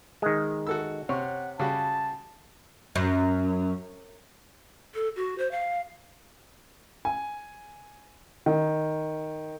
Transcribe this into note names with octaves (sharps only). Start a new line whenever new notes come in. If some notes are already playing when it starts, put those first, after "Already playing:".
D#3 G#3
F#4 A4 E6
C3 C#5 F#5
C#3 G3 F#4 A5
F#2
A4
F#4
C5
F5
G#5
D#3